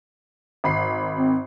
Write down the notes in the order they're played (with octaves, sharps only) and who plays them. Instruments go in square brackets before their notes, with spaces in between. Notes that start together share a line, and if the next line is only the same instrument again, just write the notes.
[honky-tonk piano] G#1 B5 C7
[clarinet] C4